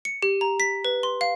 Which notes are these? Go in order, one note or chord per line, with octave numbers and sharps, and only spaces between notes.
C#7
G4
A#5
B6
B4
C6
F5